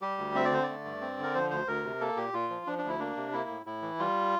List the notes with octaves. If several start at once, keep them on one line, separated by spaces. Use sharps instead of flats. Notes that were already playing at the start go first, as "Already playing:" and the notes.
G3 G4
D2
C4 E5
D5
D3 C5
D5
A3
G2
C4
D3
A#4
F3 C5
D2 C5
D2 A#4
C3
A#3 A4
A#2 G4
A#2 F4
F3
F3 D4
D4
D2 E4
A#3 D4
C3
A#3 E4
A2
A2 E4
E3
G3 F4